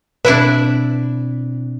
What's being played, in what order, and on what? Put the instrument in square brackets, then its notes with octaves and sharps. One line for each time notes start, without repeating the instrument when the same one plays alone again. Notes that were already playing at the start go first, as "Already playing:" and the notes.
[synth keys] B2 C4 [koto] D4 E4 E5 [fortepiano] B4